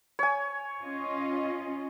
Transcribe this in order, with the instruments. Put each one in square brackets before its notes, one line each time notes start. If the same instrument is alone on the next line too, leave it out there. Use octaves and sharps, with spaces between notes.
[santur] C#5 G#5
[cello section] C#4 F4 D#5